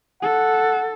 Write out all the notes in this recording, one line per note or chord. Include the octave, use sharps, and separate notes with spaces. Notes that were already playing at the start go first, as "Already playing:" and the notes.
A4 F#5